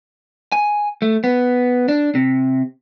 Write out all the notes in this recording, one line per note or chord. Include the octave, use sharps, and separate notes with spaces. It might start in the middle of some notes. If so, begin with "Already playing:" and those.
G#5
A3
B3
D4
C3